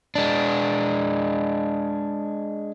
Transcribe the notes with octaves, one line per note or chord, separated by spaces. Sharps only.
G#3 D4